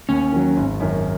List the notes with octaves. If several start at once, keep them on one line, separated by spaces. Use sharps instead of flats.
D#2 C#4
D#3 F#3
G#1
F#2 D#3